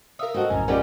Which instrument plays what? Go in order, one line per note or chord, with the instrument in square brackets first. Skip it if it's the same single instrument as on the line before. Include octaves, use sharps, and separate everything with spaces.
[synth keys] A#4 F5 D#6 [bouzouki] E5
[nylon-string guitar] C4 F#4 A4 [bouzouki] D#5
[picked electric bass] A#1 F#2 A2 [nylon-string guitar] C#3 [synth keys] G#5 A#5
[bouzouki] G3 G#3 C4 [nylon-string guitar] C#4 F4 G4 [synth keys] A#4 F#5